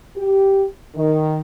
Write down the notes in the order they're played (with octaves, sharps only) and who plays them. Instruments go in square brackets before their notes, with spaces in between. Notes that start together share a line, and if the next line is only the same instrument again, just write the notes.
[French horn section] G4
D#3